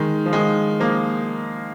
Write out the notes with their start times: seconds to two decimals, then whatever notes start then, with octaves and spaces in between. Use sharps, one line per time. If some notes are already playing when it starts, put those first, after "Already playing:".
Already playing: D#3 G#3
0.26 F3
0.33 D#3 G#3
0.80 F3 A#3